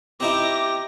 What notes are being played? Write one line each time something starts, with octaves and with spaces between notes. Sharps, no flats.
C4 D#4 E4 G4 D6 A#6